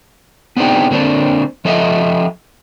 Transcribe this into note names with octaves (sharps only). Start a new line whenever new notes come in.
B3 C4 D4 D#4 G#4 G5
D3 A#3 C4 D4
F3 A4 D#5 E5 F#5